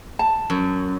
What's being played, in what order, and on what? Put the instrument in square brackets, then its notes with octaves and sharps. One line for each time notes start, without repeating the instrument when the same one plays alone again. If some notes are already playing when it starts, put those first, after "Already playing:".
[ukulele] A5
[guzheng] F#2